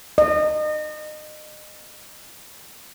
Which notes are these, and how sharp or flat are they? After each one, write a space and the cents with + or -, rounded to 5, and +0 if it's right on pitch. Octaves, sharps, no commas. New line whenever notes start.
D#5 -30